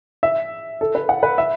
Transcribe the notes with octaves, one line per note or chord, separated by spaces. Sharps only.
E5
A4
B4
F#5
B4
E5